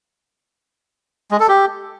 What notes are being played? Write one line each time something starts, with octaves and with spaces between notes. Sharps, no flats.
G#3
A4
G4